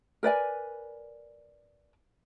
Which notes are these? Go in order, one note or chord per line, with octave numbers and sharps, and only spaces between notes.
A#4 B4 D5 G#5